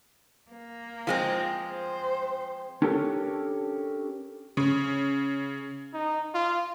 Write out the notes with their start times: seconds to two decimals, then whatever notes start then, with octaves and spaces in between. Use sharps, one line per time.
0.51 A#3
1.07 F3 G#3 C4
1.68 C5
2.82 C#4 D4 G4 A4 A#4 C#5
4.57 C#3
5.94 D#4
6.34 F4